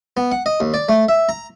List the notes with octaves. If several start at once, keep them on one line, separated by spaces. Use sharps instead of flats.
B3
F#5
D#5
D#2
D5
A3
E5
A#5